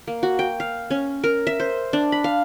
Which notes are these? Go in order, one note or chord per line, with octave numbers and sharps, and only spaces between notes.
A#3
F#4
G5
F5
C#4
A#4
E5
C5
D4
B5
F5